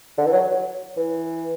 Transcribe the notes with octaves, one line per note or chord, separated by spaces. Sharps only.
D3
E3
F#3
F#3
E3